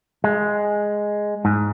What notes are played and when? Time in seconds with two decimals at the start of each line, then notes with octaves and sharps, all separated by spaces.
0.24 G#3
1.45 G#2